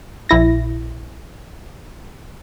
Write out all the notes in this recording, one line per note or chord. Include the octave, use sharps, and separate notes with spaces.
A#1 E4 A#6